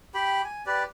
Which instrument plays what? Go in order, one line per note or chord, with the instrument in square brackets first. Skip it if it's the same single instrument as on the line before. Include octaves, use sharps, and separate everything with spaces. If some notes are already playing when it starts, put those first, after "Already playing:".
[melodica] G4 G5 B5
G#5
G4 B4 D5